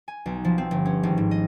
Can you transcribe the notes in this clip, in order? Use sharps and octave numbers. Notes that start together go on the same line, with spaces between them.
G#5
B1
F3
C4
G1
C#4
G#1
G#2
D#5